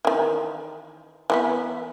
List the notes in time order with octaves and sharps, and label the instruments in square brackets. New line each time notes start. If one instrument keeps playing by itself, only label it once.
[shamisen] D#3 E3
E3 A#3 B3